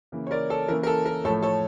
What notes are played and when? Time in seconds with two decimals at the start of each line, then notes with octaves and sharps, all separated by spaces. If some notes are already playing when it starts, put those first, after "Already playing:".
0.12 C#3 E3 A#3
0.27 C#5
0.31 A#4 D5
0.50 A4 C#5
0.68 E3 A#3 C#4 A#4
0.83 A#4
0.87 A4
1.05 A#4
1.24 A2 F3 A3 A4 C#5
1.42 A4 C#5